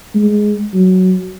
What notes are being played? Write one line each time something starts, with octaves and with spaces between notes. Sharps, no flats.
G#3
F#3